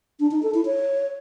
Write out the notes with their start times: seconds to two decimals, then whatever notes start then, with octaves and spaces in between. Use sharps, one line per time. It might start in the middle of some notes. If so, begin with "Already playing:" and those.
0.20 D4
0.31 D#4
0.43 A4
0.54 E4
0.66 C#5